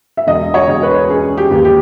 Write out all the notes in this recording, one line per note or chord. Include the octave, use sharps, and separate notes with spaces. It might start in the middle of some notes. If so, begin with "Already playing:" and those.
E5
E1 D#5
C#5
E1
B4
C#4 G#4
G4
D#2
G4